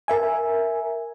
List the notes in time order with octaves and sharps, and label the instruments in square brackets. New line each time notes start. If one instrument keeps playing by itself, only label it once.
[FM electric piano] A#4 E5 G#5